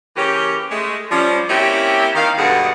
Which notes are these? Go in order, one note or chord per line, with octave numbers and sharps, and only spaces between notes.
C#3 E3 A#3 C#4 G4
G#3 A3
F3 G3 C#4
A#3 C4 C#4 E4 G4
D#3 F5
G2 B2 G#3 G#4 A4 F#5